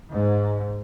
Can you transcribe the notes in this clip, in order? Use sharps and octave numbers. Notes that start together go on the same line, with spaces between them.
G#2